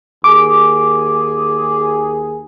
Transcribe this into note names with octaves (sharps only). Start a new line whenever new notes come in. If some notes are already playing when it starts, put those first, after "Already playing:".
D#2 G#4 D6